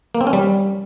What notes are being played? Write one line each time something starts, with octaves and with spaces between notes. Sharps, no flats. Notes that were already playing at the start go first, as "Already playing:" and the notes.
A#3
C4
C#4
G3